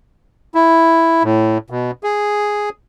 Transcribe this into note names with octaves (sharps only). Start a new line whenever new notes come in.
E4
A2
B2
G#4